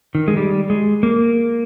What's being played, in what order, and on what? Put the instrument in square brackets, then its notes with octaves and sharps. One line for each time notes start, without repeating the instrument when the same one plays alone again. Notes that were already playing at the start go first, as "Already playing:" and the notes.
[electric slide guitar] D#3
G#3
G3
G#3
A#3